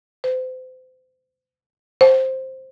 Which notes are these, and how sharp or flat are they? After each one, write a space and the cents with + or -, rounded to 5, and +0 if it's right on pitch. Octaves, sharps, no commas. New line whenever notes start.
C5 -35
C5 +5